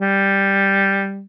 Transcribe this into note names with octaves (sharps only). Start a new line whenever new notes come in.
G3